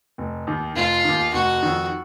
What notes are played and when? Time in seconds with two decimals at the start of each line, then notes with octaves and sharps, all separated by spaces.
0.18 F1
0.47 D#2 D#3
0.76 F1 F4
1.04 D#2 D#3
1.34 F1 F#4
1.62 F2 D#3